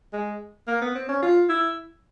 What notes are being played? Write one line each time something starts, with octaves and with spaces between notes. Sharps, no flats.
G#3
A#3
B3
C4
C#4
F4
E4